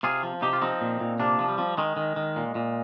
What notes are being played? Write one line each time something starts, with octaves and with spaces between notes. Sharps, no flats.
C3 F4 G#4
F3
C3 D#4 G4
F4
F3 C4 D#4
A#2
A#2
C3 A#3 D4
F3
G3
F3
D#3 G#3
D#3
D#3
A#2
A#2